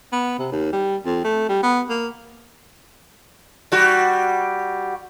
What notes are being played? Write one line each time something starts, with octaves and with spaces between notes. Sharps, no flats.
B3
C3
D#2
G3
F2
A3
G3
B3
A#3
G3 F#4